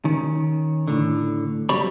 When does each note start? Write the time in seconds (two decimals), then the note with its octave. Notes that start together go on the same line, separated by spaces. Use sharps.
0.05 D#3 C#4
0.88 A2 D3
1.69 C3 F#3 G3 C4 C#5 B5